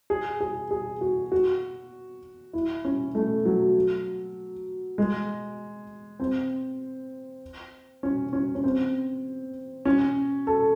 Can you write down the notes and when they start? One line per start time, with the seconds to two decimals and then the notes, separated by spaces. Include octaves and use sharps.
0.10 G#4
0.40 G#4
0.71 G#4
1.01 F#4
1.32 F#4
2.53 E4
2.85 C#4
3.15 A3
3.46 F#3
4.98 G#3
6.20 C4
8.03 C#4
8.33 C#4
8.55 C#4
8.64 C4
9.85 C#4
10.47 A4